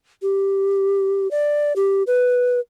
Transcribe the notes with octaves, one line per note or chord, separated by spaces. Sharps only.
G4
D5
G4
B4